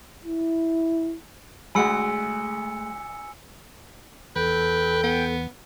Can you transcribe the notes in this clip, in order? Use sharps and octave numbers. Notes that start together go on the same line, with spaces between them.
E4
D2 G#3 A3 F#4 G#5 B5 E6 C#7
E2 A4 B4 G5
B3